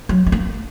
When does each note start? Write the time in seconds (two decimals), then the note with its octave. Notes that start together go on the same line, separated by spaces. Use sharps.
0.09 F#3
0.26 A3
0.32 A#3